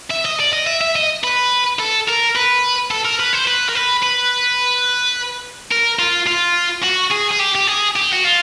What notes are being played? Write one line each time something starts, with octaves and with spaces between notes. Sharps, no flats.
E5
D#5
D5
D#5
E5
E5
D#5
B4
A4
A#4
B4
A4
A#4
B4
C5
B4
A#4
B4
B4
A#4
F4
F4
F#4
G#4
G#4
G4
G4
G#4
G4
F#4
F4